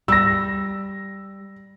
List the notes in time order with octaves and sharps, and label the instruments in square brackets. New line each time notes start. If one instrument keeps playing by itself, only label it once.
[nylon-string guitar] G3 [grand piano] E6 A#6